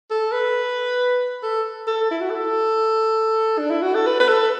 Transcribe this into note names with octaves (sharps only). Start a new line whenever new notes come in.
A4
B4
A4
A4
E4
F#4
A4
D4
E4
F#4
A4
B4
B4
A4